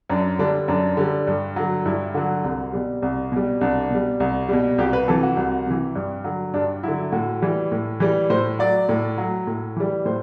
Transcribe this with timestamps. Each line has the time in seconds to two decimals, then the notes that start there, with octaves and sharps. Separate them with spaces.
0.10 F#2 D4
0.39 D3 G3 D4
0.68 F#2 D4
0.97 D3 G3
1.27 G2
1.56 D3 F#3
1.85 G2 E4
2.14 D3 F#3 F#4
2.44 C2
2.73 B2 G3
3.02 C2
3.32 B2 G3
3.61 C2 D4
3.90 B2 G3
4.20 C2
4.49 B2 G3
4.78 C2 G4
4.93 B4
5.08 C3 E3 A4
5.23 F#4
5.37 C2
5.66 C3 E3
5.95 G2
6.24 D3 F#3
6.54 G2 D4
6.83 D3 F#3 E4
7.12 A2 F#4
7.42 E3 G3
7.72 A2
8.00 E3 G3
8.30 A2 C5
8.59 F#3 D5
8.89 A2
9.18 F#3
9.47 A2
9.76 E3 G3
10.05 A2 C5